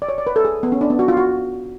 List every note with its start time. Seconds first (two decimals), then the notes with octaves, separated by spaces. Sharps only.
0.02 D5
0.09 C#5
0.18 D5
0.27 B4
0.36 A4
0.45 G#4
0.63 B3
0.72 C#4
0.81 D4
0.90 B3
0.99 F#4
1.08 F4
1.17 F#4